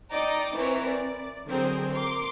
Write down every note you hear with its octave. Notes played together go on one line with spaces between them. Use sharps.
D#4 D5 D#5 G5 A#5 D6
E3 C4 A#4 C5 C#5
D5
D3 F#3 C4 G#4 A#4 C5
A#4 C6 D6